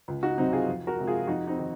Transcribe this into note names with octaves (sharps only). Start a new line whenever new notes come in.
C#2
D#4 F#4
C3 F#3 C4 D#4
F4 G#4
F2
F#4 A#4
C3 F3 G#3
F4 G#4
F2 D#4 F#4
C4 D#4
D#3